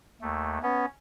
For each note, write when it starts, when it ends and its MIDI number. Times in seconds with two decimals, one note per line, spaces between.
0.22 0.58 39
0.22 0.58 57
0.63 0.86 59
0.63 0.86 61